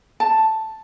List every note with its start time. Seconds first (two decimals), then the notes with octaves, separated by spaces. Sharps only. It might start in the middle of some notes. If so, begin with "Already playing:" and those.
0.20 A5